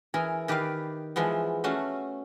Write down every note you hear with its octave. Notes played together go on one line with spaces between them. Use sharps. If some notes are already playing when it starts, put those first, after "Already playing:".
E3 G#4 A#4
D#3 G4 B4 D5 F5
E3 F3 G#3 B3
A3 C#4 F#4 F5